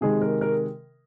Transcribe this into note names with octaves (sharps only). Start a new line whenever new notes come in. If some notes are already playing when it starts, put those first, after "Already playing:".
C3 D#3 G#3 G#4
A#4
A#4